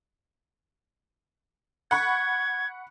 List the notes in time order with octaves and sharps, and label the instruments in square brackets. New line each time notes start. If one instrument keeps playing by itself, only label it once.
[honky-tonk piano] F#5 B5 C#6 [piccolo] G#6